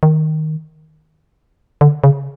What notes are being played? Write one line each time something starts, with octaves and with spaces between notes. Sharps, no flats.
D#3
D3
C#3